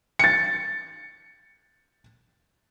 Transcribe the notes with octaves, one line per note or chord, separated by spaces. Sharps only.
A6 C#7